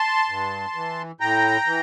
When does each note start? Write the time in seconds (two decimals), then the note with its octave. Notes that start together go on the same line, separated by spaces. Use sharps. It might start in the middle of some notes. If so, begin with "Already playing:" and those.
Already playing: A5 C6
0.29 G2
0.75 E3
1.20 A2 G5 A#5
1.67 E3